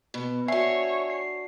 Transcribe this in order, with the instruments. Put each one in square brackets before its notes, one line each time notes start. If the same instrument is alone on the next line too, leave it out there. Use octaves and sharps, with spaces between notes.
[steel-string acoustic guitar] B2
[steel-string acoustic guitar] D4 F#4 [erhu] C#5 [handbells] E5 G#5 C7
[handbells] C7